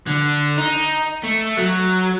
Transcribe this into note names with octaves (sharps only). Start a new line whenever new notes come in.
D3
D#4
A3
F#3